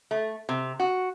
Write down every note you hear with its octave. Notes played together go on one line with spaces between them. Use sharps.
A3
C3
F#4